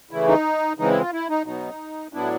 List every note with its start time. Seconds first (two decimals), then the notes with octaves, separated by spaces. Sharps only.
0.11 C#3 E3 A3 E4
0.27 D#4
0.79 C#3 E3 G#3 C4 D#4
0.90 E4
1.01 F4
1.12 E4
1.29 D#4
1.45 B2 F#3 B3 D#4
2.13 A2 F#3 B3 D4 E4